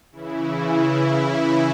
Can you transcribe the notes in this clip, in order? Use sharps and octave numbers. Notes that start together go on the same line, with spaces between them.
C#3 E3 E4
E4
E4